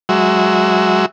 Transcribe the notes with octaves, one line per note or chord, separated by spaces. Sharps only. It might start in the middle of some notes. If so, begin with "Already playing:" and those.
F#3 G#3 F#4 E5